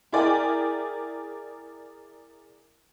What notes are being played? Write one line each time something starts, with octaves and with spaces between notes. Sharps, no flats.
E4 G#4 A#4 D5 G5 G#5